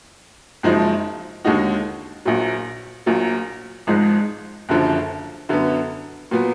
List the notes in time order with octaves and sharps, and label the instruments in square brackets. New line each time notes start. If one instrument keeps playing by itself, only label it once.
[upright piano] F#1 F#2 F3 G#3 D#4
D#2 D3 G#3 D#4 F#4
A#1 A#2 F#3
A#1 A#2 F#3
G#1 G#2 F3 G#3 D#4
F#1 F#2 D3 F3
F#2 D3 F#3 B3
A#2 F#3 B3